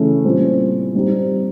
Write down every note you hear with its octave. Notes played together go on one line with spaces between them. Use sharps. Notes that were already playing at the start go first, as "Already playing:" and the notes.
Already playing: C#3 E3 A3 C#4
A#2 G3 C4
G3 C4 D#4 G4